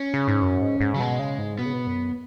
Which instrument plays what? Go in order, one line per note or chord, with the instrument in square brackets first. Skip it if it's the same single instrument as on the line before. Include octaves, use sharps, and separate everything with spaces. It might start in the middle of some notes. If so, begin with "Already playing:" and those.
Already playing: [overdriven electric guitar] C#4
[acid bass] C#3
G#2
F#2
G#2
G#2
[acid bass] C#3 [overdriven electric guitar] F#3
[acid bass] B2 [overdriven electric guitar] G#3
[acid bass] C#3
G#2
[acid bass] B2 [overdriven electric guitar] B3
[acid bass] C#3
B2
F#2